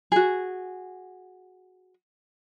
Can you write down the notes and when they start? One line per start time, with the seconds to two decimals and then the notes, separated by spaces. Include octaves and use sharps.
0.12 F#4 G#4